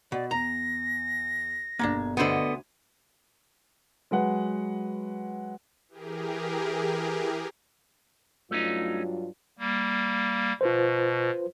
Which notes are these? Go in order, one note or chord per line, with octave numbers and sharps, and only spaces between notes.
B2 D5
E2 A#5 A#6
G1 B2 A#3 C#4 D4 G#6
D2 D3 B3 C5 D#5 B5
F#3 G#3 B4 F#5
E3 G4 G#4 A#4
G2 F#3 A3 C#4 D#4 F4
G3 A#3
B2 F4 B4 C5